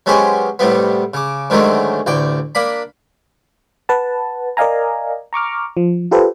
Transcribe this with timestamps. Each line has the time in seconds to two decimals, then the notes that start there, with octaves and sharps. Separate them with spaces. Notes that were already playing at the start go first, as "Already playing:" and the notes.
0.06 F#3 G#3 B3 C#4 G4 C5
0.59 A2 C3 G3 B3
1.14 C#3 D6
1.50 G#2 D3 D#3 F#3 G#3 A3
2.06 A1 D2 D5 G5
2.55 A#3 D4 B5
3.89 B4 F#5 A5
4.57 A#4 D5 D#5 F5 G#5 A#5
5.33 A#5 C#6 D6 F6
5.77 F3
6.11 F4 G4 A4 B4 C5